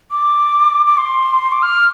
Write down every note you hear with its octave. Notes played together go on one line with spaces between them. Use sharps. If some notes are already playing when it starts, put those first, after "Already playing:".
D6
D6
C6
D6
F6